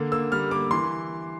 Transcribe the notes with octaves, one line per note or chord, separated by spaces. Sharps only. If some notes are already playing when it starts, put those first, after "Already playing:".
Already playing: D3 A#3
A#3 E6
G3 F6
A#3 D6
E3 C6